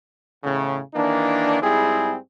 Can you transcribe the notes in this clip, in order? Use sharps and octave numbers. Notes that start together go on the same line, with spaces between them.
E2 A2 C#3
D#3 E3 A#3 D4
G#2 G3 C4 E4 G#4